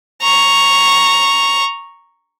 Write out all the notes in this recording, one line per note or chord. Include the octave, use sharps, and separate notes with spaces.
A#5 C#6